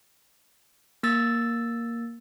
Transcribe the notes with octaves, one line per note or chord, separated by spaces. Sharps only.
A#3 E6 A6